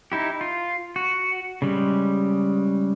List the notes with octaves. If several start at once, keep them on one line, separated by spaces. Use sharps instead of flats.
D#4 E4 G4
F4
F#4
C#3 G3 G#3